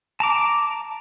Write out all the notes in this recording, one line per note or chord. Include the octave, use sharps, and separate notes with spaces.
A5 A#5 D6